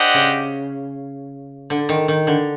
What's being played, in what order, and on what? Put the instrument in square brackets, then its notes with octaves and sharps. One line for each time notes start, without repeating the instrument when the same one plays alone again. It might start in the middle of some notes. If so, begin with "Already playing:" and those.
Already playing: [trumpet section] D4 G4 C5 D#5 F#5
[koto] C#3
D3
D#3
D#3
D3